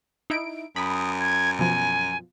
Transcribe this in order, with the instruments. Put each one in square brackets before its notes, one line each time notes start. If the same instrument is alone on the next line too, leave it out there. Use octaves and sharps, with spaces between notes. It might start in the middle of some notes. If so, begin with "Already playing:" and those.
[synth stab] D#4 E4 D7
[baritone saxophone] F#2 [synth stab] B5 [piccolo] D#6
[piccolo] G#6
[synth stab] B2 F3 [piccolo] G#5